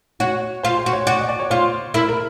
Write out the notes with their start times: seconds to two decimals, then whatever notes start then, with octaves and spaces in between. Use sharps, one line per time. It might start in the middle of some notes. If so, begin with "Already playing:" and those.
0.20 F#4 C#5
0.63 F4 C5
0.78 C5
0.86 F#4
0.93 C#5
1.07 F#4 D5
1.18 D#5
1.29 D5
1.40 C#5
1.50 F4 C5
1.94 E4 A#4
2.09 A#4